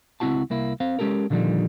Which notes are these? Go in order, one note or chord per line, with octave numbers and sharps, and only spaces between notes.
C#2 C4 E4 F#4 A5
C2 A#3 E4
C4 C5 F5
G#3 C#4 G4 A4 A#4
A#2 D3 D#3 F3 G3